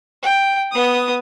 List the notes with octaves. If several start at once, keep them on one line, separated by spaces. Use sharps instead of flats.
G5
B3 D#6